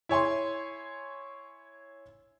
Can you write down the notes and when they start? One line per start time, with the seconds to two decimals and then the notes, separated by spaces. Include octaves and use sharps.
0.09 E4 C#5 G#5 C6